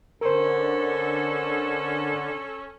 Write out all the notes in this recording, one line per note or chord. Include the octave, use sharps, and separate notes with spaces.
D3 C#4 A4 A#4 C5